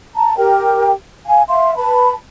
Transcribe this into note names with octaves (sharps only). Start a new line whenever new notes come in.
A5 A#5
G4 A#4 G5
F5 G#5
E5 F5 C6
B4 A5 B5